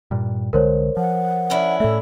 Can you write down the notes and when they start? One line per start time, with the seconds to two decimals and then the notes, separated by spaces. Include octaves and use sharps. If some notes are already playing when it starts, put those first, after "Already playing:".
0.11 G2 A#2
0.53 C2 D3 G#3 A#4 C5 C#5
0.97 F3 F#5
1.50 C#4 D4 E4
1.80 A2 A3 A4 E5